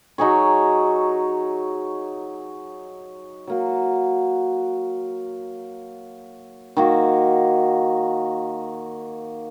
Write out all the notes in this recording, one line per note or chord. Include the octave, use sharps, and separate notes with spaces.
F#3 D#4 G#4 C#5
F#3 A#3 F#4
D#3 A#3 F#4